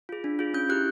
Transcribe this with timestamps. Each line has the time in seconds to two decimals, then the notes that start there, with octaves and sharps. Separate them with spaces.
0.09 F4 G#4
0.24 D4
0.39 F4 G#4
0.54 C#4 G6
0.69 E4 G4 F#6